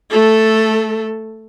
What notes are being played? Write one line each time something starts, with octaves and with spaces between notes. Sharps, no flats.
A3 A4